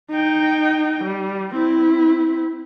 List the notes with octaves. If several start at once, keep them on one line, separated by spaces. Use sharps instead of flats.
D#4 G5
G3
C4 E4